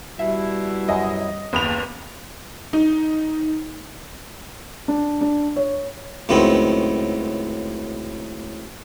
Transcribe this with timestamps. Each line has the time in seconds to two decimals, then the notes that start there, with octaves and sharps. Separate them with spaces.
0.19 B2 G3 E4 E5
0.89 F#2 D#5
1.53 F#1 D#2 B3 F7
2.73 D#4
4.88 D4
5.21 D4
5.56 C#5
6.29 C#2 F#2 A2 D#3 B3 C4